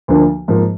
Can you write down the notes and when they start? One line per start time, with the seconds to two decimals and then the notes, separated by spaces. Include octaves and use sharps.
0.08 D2 D3 F3 A#3 D4
0.48 G#2 F3 A#3